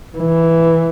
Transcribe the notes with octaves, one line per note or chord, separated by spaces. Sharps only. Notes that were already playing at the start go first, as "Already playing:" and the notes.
E3